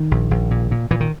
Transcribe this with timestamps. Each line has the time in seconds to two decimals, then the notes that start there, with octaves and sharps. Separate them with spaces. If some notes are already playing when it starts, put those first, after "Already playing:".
Already playing: D#3
0.11 A#1
0.31 A#1
0.51 A#2
0.71 A#2
0.91 A#2 E3
1.00 D#3